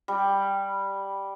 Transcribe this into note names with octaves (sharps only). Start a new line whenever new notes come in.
G3